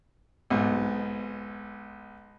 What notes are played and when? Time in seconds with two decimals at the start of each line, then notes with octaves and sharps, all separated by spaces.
0.50 B1 G#2